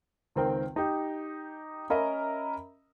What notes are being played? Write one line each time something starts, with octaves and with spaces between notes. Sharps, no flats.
C#2 D#3 C4 A#4 G5
D#4 G4
C#4 A#4 D#5 E5 A#5 B5